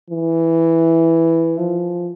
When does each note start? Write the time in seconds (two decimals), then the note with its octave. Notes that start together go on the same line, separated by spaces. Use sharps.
0.10 E3
1.58 F3